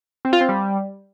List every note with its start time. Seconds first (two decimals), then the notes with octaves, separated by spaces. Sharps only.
0.25 C4
0.33 F4
0.41 C4
0.49 G3